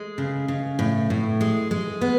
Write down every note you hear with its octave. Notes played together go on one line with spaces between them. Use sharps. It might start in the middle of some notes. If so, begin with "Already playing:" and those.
Already playing: G#3
C#3
C#3
A2
A2
G#3
G#3
B3